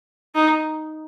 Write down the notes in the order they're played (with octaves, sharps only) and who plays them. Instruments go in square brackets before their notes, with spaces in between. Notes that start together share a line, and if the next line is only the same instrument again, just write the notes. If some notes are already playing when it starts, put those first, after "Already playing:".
[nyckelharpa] D#4